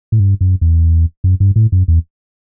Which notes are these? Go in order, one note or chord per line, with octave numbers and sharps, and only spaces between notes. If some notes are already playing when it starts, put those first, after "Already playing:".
A2
G2
F#2
E2
F#2
G2
A2
F#2
E2